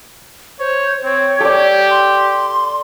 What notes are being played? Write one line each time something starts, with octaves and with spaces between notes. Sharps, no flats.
C5 C#5
C4 C#5
G4 A4 D5
C6